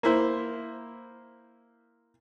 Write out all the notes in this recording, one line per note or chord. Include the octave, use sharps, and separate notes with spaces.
A#3 E4 C5